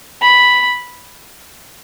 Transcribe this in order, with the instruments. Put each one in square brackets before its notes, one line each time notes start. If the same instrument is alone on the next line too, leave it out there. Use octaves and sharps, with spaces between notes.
[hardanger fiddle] B5